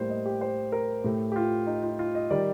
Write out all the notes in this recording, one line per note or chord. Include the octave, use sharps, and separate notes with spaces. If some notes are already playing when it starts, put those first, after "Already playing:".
Already playing: A2 G3 A#3 C5
D#5
G4
C5
A#4
A2 A3 G4
G4
F4
D#4
F4
F4
D#5
D#3 G3 D5